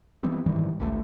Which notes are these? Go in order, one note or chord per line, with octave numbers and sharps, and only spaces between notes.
E3 G3 B3 C4
G#2 D#3 E3 G3
G#1 C#2 D3 A3